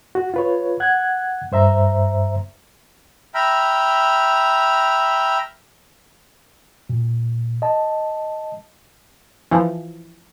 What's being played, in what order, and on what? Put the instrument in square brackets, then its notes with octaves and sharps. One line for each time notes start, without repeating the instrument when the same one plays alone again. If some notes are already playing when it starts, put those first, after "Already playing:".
[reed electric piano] F#4
F4 B4 C#5
F#5 F#6 G#6
G2 C5 E5 A#5
[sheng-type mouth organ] E5 G5 A#5 B5 F6
[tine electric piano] A#2
D#5 A5
[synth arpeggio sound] E3 F3